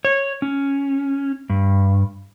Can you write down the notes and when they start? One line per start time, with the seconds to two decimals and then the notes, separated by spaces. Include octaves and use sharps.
0.05 C#5
0.42 C#4
1.50 G2